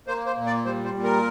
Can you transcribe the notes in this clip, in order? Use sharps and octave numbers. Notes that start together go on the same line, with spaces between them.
A#3 C5
C5
A#2
D5
G3 C5
C5
A#2
A#4